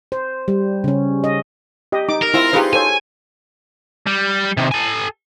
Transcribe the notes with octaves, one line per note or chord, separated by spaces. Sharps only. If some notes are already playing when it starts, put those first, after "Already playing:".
C5
G3
C#3 C#4
D#5
G4 D#5
D#4 D6
A#4
C4 E4 F4
D#4 F4 G4 G#4 B4
A4 C5 C#5 G#5
G3
C3 D#3
A4 G#5